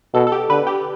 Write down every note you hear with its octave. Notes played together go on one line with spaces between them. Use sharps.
B2 A4
A4
G4
D3 B4
G4